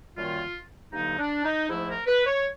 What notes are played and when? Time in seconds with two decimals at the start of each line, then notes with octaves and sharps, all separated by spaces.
0.16 F#2 D#3 G3 A#3 F4
0.92 G2 D3 F#3 A#3 D#4
1.18 D4
1.44 D#4
1.69 G#2 F3 A3 E4
1.88 A#4
2.07 B4
2.26 C#5